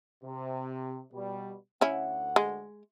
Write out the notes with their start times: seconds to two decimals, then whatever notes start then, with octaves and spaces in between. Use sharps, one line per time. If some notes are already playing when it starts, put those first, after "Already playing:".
0.23 C3
1.13 B2 G3
1.81 D2 C#4 E4 F#5
2.36 G#3